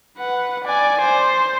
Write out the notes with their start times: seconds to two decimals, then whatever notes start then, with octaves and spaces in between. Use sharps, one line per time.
0.18 B4 F#5
0.65 D5 G#5
1.01 C5